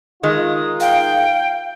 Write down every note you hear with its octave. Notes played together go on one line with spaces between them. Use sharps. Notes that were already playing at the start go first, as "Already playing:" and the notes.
D#3 G#3 D#4 F4 D#6
F5 G5